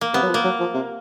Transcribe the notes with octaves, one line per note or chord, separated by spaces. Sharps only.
A#3
C3 B3
F#3
F3
A#3
F#3
F3
C3